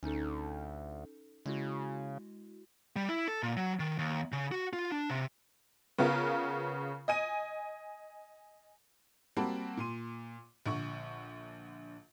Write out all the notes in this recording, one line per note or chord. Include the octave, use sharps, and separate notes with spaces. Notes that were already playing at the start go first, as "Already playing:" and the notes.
D2 C#4 D#4 A4
C#3 G#3 E4 F#4
G3
E4
A4
A#2
F#3
D#3
D#2
C#3
F#4
F4
D4
C3
C#3 B3 F4 A#4
D#5 G#5 D#7
G3 A#3 C4 F#4 A5 B5
A#2 C6 D#7
A#1 D3 C#6